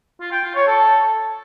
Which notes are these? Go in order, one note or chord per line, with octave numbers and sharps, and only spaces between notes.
F4
G5
F4
C#5
A4